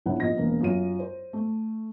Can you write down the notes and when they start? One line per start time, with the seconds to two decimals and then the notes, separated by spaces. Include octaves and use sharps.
0.06 A#1 C#3 B3 E4 F#5
0.20 F2 A#2 D#5 A#6
0.36 E1 A#3 B3
0.61 F#2 F4 D#7
0.99 C5
1.33 A3